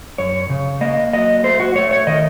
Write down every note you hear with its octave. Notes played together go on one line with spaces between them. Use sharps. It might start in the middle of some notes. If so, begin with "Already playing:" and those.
F#2 C#5
C#3
A#3 D#5
F#3 D#5
A3 C5
F#4
A3 C#5
C#5
D#3 D#5